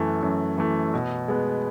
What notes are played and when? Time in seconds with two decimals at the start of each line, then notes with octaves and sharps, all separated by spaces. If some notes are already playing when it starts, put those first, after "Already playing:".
Already playing: F#2 E3 A3
0.23 F#2
0.58 E3 A3
0.94 B2
1.28 G#3 B3